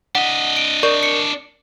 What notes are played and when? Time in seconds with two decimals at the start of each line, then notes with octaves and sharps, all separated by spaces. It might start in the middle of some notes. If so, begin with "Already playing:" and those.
0.15 D4 D#5 F#5
0.57 D7
0.83 A#4 D5 C#6
1.03 C#7